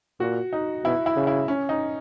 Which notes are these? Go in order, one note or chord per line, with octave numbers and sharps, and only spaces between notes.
A#2 F#4
D#4
B2 E4
E4
C#3
E4
C#4
D#4